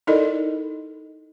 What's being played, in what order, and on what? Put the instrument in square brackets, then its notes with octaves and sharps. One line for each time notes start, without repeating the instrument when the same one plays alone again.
[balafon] D#4 E4 A4 A#4 D5 D#5